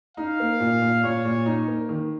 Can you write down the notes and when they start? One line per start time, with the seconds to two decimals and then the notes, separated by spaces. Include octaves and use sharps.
0.17 D#4 F5
0.40 A#3
0.60 A#2
0.82 A#2
1.04 A#2 C#5
1.25 A#2
1.46 D#4
1.68 A#3
1.89 D#3